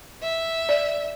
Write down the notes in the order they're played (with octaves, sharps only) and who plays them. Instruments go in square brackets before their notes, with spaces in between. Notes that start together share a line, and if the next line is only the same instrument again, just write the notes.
[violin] E5
[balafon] D5